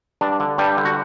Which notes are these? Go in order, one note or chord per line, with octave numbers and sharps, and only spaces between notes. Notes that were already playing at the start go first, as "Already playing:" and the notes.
G2 D4
D3
G2 G3
D3
F#4